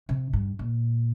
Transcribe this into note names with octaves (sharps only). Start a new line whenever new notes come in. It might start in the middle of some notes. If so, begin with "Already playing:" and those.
C3
G2
A#2